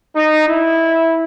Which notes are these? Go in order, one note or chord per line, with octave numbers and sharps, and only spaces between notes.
D#4
E4